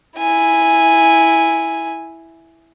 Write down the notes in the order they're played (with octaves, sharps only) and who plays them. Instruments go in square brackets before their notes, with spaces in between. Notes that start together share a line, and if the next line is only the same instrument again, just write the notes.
[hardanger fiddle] E4 G#5